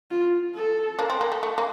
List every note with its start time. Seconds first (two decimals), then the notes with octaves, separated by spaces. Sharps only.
0.11 F4
0.55 A4
0.99 A#3 D4
1.10 C4
1.21 A#3
1.32 A3
1.43 A3
1.58 A#3